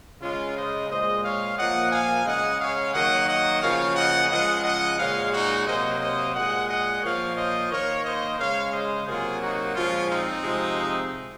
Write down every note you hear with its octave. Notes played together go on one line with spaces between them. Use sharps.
C#3 G#3 C#4 F4
C5 D#5
A#2 G#3 C5 D#5
C#5 F5
A#2 F3 A#3 D#5 F#5
F5 G#5
C#3 G#3 D#5 F#5
C#5 F5
D#3 F#3 A#3 D#5 F#5
D#5 F#5
C#3 F3 A#3 C#5 F5
D#5 F#5
C#3 F3 G#3 D#5 F#5
D#5 F#5
A#2 G#3 C#5 F5
D#4 F#4
C3 F#3 A#3 C5 D#5
C5 D#5
A#2 G#3 D#5 F#5
D#5 F#5
A#2 F3 A#3 C#5 F5
C5 D#5
D#3 A#3 A#4 C#5
C5 D#5
C#3 G#3 C#5 F5
C5 D#5
C3 F#3 A#3 F4 G#4
D#4 F#4
A#2 F3 G#3 C#4 F4
C4 D#4
C3 F3 G#3